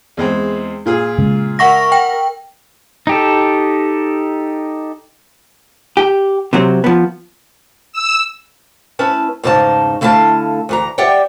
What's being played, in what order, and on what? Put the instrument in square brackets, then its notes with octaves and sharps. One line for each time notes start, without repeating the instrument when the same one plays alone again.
[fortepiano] E2 G#3 C4
A#2 F4 G#4
[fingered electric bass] C#3 G#3
[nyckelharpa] A#4 [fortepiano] E5 [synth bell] F#5 C#6 A#6
[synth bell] G5
[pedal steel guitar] D#4 G4 A4
[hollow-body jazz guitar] G4
C3 F#3 C4
F3 B3
[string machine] E6
[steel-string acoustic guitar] C#4 E4 B4 A5
E2 G#2 C#3 D#4 A5
D3 A3 E4 F5 A5
D2 E3 A#5
G4 D5 E5 F#5 G5